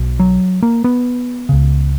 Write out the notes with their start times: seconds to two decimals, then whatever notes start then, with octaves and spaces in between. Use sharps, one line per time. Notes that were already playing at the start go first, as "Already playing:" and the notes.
Already playing: B1 B2
0.20 F#3
0.62 A#3
0.84 B3
1.49 C#2 C#3